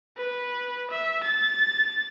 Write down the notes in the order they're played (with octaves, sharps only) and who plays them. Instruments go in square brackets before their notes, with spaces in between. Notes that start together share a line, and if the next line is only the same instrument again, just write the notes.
[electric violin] B4
E5
A6